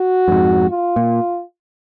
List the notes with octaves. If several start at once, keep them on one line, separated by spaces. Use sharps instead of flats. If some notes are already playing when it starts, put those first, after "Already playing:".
Already playing: F#4
F#2
F2 G#2
F4
A#2